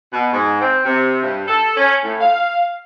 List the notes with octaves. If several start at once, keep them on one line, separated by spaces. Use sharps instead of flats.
B2
G#2
C4
C3
G2
A4
C#4
A2
F5